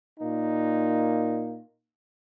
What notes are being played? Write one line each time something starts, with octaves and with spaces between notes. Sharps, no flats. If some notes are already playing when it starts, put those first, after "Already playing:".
A#2 A#3 D#4